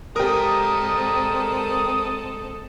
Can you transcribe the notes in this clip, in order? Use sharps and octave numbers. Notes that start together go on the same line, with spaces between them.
G#3 C4 G4 A4 A#4 D5 A#5 D#6